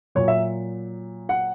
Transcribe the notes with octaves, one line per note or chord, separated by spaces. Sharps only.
A#2 F#3 C#5
E5
F#5